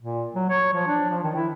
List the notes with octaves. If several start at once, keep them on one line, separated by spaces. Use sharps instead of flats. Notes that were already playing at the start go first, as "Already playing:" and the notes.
A#2
F#3
C#5
F3
D4
F3
D#3
E4